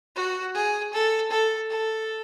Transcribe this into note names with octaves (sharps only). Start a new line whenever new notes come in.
F#4
G#4
A4
A4
A4